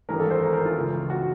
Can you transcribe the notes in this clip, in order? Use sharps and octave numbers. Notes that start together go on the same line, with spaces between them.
G#1 G2 E3 A3 A#4
A4
C5
A#4
A#4
F4
C#2 C#3 E3
F#4